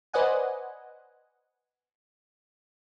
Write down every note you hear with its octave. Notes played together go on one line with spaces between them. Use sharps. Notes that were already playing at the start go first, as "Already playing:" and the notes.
B4 C5 D5 D#5 F#5 G#5